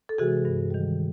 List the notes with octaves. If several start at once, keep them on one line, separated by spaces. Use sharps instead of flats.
A4
C3 E3 G#3 F#4 G#4
G2
D#3 G3